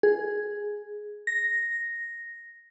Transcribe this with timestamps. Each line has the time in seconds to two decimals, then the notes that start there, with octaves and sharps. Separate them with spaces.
0.03 G#4
1.27 A#6